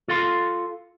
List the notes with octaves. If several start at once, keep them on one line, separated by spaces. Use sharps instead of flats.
F4 A4 F5 C6